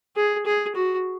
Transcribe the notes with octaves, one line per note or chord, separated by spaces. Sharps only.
G#4
G#4
F#4